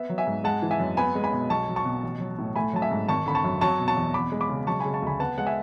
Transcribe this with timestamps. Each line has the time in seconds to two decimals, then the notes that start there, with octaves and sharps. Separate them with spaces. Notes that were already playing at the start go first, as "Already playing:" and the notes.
Already playing: B3 E5
0.09 F#3
0.18 E5 G#5
0.27 G#2
0.44 G#3 F#5 A5
0.62 E3
0.71 E5 G#5
0.80 F#2
0.97 B3 G#5 B5
1.15 G#3
1.24 G#5 B5
1.33 B2
1.50 B1 A5 C#6
1.68 F#3
1.76 A5 C#6
1.85 B2
2.03 A1
2.20 F#3
2.38 A2
2.56 A3 G#5 B5
2.73 F#3 A5
2.82 E5 G#5
2.91 G#2
3.08 G#1 A5 C#6
3.26 D3 B5
3.35 A5 C#6
3.44 F#2
3.61 F#3 A5 C#6
3.80 B2
3.88 A5 C#6
3.97 E2
4.14 E2 B5 D6
4.32 G#3
4.41 B5 D6
4.49 C#3
4.67 F#3 A5 C#6
4.80 G#5 B5
4.85 C#3
4.94 A5 C#6
5.02 D2 G#5 B5
5.20 B3 F#5 A5
5.38 G#3 F#5
5.46 E5 G#5